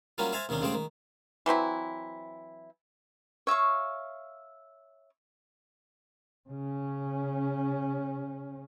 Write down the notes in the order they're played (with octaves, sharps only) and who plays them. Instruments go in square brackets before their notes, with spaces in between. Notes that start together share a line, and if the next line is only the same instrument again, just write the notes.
[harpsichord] F#3 G3 A#3 C#4 F4 G4
C5 E5 F5 G#5 A5
D#2 C3 D#3 C#4 D4
F#2 C#3 G#3 A3 C5 G5
D#3
[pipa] E3 F#3 C4 E4
[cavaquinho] C#5 E5 F5 C#6
[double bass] C#3 C#4